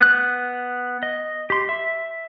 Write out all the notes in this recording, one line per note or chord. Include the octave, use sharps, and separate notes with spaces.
B3 F#6
D#5
G4 C6
E5